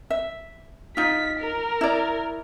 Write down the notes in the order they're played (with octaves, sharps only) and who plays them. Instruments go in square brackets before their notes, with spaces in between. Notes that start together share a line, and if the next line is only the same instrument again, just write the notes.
[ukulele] E5
[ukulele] D#4 F4 [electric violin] B6
[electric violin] A#4
[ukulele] E4 D5